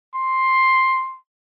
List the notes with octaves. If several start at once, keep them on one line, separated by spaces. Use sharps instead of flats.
C6